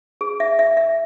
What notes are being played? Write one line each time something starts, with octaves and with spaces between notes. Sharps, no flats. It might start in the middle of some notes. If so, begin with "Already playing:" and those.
G#4
E5
E5
E5